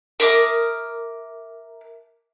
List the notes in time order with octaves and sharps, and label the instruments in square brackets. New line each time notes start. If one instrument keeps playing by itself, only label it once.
[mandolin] A#4 E5 D6 D#6